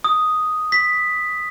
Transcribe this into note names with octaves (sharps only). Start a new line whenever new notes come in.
D#6
B6